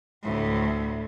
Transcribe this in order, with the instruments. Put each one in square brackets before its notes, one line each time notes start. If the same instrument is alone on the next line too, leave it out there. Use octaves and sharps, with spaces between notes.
[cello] D2 A2